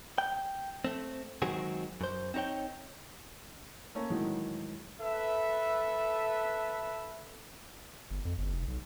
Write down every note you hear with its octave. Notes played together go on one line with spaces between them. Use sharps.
G5
A3 C4
D#3 F#3 G#3 C4 F#4 G#4
F#2 C5
C4 D#4 F#4 C#5 G5
A3 A#3 C#4
A2 D#3 E3 F#3 G#3
A4 B4 E5
G1
F2
G1
F1
B1